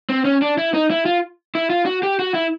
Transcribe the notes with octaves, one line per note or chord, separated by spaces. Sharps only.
C4
C#4
D4
E4
D#4
E4
F4
E4
F4
F#4
G4
F#4
E4